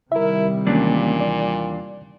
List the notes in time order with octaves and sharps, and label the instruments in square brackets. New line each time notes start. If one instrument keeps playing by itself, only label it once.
[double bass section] C3 D#3 G3 [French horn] E4 [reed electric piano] A#4 E5
[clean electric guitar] D#2 E3 D4 [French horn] A#2 [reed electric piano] G#3 A#3 C#4
[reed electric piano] D5